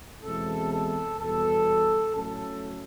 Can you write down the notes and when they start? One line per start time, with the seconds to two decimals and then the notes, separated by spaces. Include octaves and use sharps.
0.23 E2 B2 G#3 C4 E4 A4
0.71 A4
1.19 E2 B2 G3 A4
2.15 A2 F#3 A3 C#4 A4